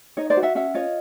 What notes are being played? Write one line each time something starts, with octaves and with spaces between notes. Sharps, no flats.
D#4 C#5 D#5
C5 D5
F#4
E5 F#5
C#4 E5 F#5
F4 C#5 D#5